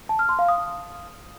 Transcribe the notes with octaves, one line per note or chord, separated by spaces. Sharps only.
A5
F6
C6
F5
D#6